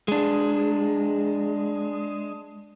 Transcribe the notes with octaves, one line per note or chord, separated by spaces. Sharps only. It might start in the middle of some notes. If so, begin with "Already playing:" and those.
G#3 D4